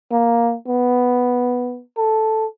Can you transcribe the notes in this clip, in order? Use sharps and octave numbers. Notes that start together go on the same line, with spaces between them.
A#3
B3
A4